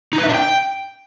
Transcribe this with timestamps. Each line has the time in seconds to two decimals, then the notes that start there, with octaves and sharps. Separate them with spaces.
0.13 D#4
0.18 B4
0.24 E5
0.29 D4
0.34 G5